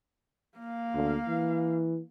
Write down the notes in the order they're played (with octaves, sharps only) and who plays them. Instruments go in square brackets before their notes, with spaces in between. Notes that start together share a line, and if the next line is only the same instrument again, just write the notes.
[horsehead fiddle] A#3 F5
[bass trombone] D2
E3